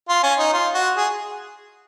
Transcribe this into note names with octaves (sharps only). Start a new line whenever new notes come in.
F4
C#4
D#4
F4
F#4
G#4